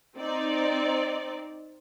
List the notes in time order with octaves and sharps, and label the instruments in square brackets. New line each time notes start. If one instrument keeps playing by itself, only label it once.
[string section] C4 D#4 D5